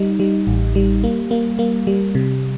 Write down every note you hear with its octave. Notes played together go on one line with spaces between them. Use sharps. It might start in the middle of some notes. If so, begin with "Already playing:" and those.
Already playing: G3 D#4
G3
A1
G3
A#3
A#3
A#3
G3
C3